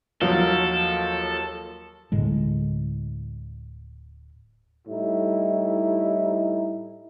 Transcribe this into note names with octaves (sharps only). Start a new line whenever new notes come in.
D#2 F3 F#3 A4 F5
D1 A2 D3 G#3
A2 G3 D#4 E4